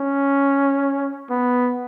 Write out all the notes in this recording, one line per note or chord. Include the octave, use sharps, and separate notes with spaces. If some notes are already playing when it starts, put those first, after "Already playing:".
Already playing: C#4
B3